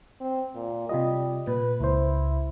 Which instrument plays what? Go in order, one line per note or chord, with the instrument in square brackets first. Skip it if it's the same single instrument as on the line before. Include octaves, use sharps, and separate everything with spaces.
[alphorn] C4
A#2
[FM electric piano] C3 F4 D#5 [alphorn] G3
[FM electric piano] A#2 [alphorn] B4
[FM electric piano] C#2 C5 [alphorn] E4